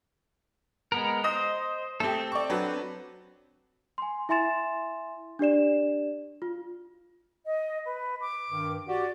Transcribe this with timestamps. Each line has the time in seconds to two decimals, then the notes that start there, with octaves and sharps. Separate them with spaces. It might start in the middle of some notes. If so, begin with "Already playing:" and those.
0.92 G#3 B3 A#4
1.24 C5 D#5 D#6 A#6
2.00 A3 C4 G4 A4
2.32 D5 C#6
2.50 F#3 D4 B4
3.98 G#5 C6
4.29 E4 E5 G#5 C6 A6 E7
5.39 D4 G4 D5 E7
6.42 F4
7.44 D#5
7.85 B4
8.20 D6
8.51 G2 D#3
8.88 F#4 G4 D5